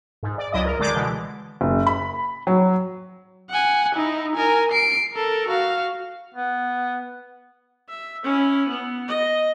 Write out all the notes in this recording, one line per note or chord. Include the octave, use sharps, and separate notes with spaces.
G#2
D5
C#2 F#3 E4 D5 D#5 D#6
A#4
D3 G#3 D5 D6 G6
B2 D3 E3 G#3
F#1
B5
F#3
F#5 G#5
D#4 E4
A#4 G#5
C7 D7
A4 A#4
F#4 F5
B3
E5
C#4 E4
B3
D#5